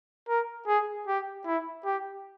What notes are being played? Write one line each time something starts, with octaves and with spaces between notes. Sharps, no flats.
A#4
G#4
G4
E4
G4